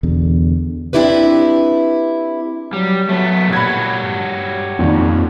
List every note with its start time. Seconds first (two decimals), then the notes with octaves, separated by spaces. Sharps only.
0.03 E2 B2 D3
0.93 C4 D4 E4 G4 B4
2.73 F#3 G3
3.09 F#3 A3 B3
3.53 A#2 G4 C#5 F#5 B5 F#6 G#6
3.97 G2
4.79 F2 A#2 D#3